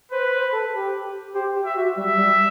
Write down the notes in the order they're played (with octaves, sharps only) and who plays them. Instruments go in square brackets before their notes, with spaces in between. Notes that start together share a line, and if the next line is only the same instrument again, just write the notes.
[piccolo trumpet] B4 [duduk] C5
[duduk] C5
A4
G4
[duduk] G4 [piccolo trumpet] C5
[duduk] G4
[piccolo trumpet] E5
[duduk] F#4
[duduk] G3 [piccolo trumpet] E5
[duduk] G3